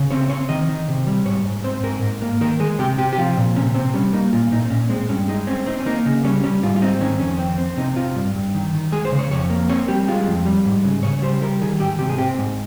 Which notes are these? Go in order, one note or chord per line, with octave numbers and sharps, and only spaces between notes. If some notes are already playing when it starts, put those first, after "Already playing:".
Already playing: C#3
C4 C#5
C4 C#5
D#3 D#5
D#3
C3
G3
G#2 C#5
G#2
C4 C5
G#2 A#4
G#2
A#3
D#3 A#4
G#3 G#4
C3 G4
C3 G4
G4
F3 F4
A#2
C3 C#4
C3 C4
G3 C#4
A#3 D#4
A#2 F4
A#2 D#4
C4
A#2 C#4
G#3 C4
G2 C#4
G#3 D#4
C4 C#4
C4 D#4
C#4
A#3 D#4
C#3
G3 C#4
G3 C#4
G#2 F4
F4
C4 D#4
D#3 C#4
F2 C#4
C4
C4
C3 D#4
C3 F4
G2
G2
D#3
D#3
G#3 G#4
C5
C#3
C#5
F2 C#5
A#3
C4 C#5
G3 G4
G#3 F4
F2
G3
G#2
C#3
C#3 C#5
G3 C5
G3 A#4
D#3 G#4
G#2 G4
C3 G4
G#4
C4 G4
G#2